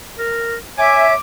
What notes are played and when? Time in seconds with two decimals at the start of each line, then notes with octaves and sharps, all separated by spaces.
0.19 A#4
0.78 C#5 E5 G#5 D6